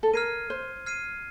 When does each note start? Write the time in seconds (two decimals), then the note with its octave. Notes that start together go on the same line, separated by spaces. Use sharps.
0.03 A4
0.13 A#4 F6 G#6 C7 D#7
0.50 C5
0.86 F6 G#6 C7 D#7